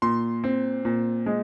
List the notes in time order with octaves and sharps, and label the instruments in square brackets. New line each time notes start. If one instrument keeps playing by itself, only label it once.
[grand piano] A#2 C6
C4
A#2
G#3